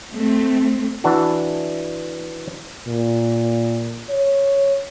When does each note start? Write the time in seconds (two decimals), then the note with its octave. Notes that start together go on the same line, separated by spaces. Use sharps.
0.14 A3 C4
1.04 E3 D4 F#4
2.88 A#2
4.10 C#5